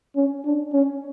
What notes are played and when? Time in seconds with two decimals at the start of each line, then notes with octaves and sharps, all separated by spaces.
0.16 C#4
0.44 D4
0.73 C#4